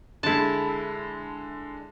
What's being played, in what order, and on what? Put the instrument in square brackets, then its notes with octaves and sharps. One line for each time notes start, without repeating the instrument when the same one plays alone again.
[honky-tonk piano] D3 G#3 [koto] E4 A5